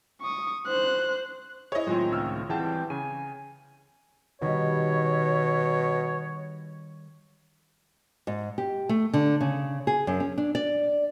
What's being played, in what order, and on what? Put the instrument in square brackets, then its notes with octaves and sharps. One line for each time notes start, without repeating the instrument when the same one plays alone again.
[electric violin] C#6 D#6
C5 F#6
[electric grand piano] E4 G#4 [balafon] C5 E5 [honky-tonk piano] C#5 D#5
[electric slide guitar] A2 D#3 C4 [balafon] F#3 F4 G#5 [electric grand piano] G#3
[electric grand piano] C#2 E6 F6
[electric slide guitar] E3 G3 C4 [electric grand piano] E4 G5 A5 [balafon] G#4 F#5
[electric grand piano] C#3 [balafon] C#4 C#6 [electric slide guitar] G#5
[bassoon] B2 [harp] D#3 G3 [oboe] C#5
[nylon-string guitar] G#2
G4
A3
D3
C#3
G#4
F#2
C#4
D4
D5